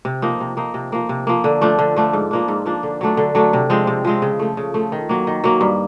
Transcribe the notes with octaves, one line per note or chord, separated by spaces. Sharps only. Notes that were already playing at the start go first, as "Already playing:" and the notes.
C3
F3 A#3 D#4
C3
F3 A#3 D#4
C3
F3 A#3
C3
F3 A#3
D3
F3 A3 D4
D3
F3 A3 D4
G#2
F3 A#3 D4
G#2
F3 A#3 D4
D3
F#3 A3 D4
D3
F#3 A3 D4
C3
F3 G#3 C4
C3
F3 G#3 C4
C#3
F3 A3
C#3
F3 A3
D#3
F#3 A#3
D#3
F#3 A#3
G2